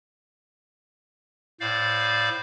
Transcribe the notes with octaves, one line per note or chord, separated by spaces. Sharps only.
A2 C5 D5 F5